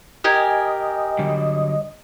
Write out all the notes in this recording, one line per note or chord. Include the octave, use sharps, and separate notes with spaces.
G4 A#4 D#5 G#5
D3 F#3 G3